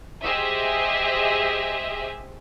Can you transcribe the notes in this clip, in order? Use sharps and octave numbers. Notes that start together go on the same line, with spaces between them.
G4 G#4 C5 D#5 E5 D#6